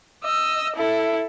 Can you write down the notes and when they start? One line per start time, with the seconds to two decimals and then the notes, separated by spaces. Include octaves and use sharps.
0.24 D#5 E6
0.76 E4 A4